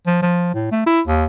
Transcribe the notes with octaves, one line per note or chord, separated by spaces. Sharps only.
F3
F3
A2
A3
E4
D#2